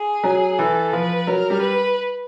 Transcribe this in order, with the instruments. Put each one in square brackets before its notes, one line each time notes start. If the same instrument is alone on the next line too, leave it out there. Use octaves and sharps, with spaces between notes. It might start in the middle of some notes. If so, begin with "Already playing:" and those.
Already playing: [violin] G#4
[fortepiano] F#3
[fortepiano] E3 [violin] A4
[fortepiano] F3 [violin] B4
[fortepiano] F#3 [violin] A#4
[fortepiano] G3
[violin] B4